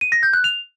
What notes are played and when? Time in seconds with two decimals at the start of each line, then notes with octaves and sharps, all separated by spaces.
0.01 D#7
0.12 A#6
0.23 G6
0.33 F#6
0.44 F7